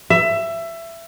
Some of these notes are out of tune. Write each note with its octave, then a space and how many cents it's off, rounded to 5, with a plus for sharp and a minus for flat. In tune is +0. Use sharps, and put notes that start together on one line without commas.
E5 +20